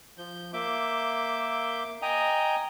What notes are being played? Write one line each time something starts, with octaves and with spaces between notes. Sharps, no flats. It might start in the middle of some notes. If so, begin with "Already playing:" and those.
F3 G6
A#3 E5 D6 G6
D#5 G5 G#5 A#5 D#6